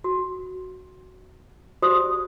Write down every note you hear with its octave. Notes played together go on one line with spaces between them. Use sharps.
F#4
F#4 G4 C5 D5 D#6